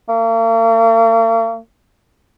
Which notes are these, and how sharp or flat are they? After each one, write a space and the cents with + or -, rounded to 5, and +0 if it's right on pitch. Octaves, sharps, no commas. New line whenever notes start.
A#3 -45